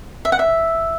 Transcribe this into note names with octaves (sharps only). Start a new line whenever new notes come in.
E5
F#5
E5